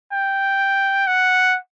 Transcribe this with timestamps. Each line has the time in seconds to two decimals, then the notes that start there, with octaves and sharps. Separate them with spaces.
0.12 G5
1.07 F#5